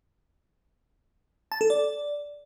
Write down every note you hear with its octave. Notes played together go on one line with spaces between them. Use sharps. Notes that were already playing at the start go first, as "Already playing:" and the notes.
A5
A4
D5